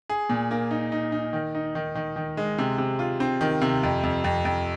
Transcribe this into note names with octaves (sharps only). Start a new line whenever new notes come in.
G#4
A#2
A#3
D#4
D#4
D#4
D#3
D#4
D#3
D#3
D#3
G#3
C3
C3
F4
C4
D#3
C3
F2
F2
F2
F2